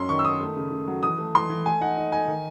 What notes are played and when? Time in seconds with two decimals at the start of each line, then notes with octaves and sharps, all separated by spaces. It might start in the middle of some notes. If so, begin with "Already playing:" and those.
Already playing: F#2 C#4 C6
0.09 D#3 C#6
0.19 E6
0.25 D#3 D#6
0.40 A3
0.57 C#3
0.71 C#3
0.87 F#3
1.03 E3 D#6
1.18 A3
1.34 E3 C6
1.50 E3
1.66 A3 G#5
1.81 D#4 F#5
1.97 D#4
2.12 D#4 G#5
2.28 D#3